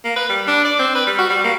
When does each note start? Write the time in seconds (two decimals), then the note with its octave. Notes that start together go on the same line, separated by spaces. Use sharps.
0.05 A#3
0.16 B4
0.29 G3
0.47 D4
0.65 D5
0.79 C4
0.95 B4
1.07 G3
1.19 F#4
1.30 G3
1.45 A#3